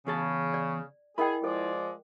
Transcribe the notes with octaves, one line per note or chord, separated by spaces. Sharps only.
E2 C#3 G#4 A5
D5
E4 G#4 A#4 D#5 G5 B5
F3 G#3 A4 D5